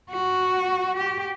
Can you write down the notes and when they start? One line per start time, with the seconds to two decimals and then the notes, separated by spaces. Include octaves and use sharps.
0.11 F#4
0.97 G4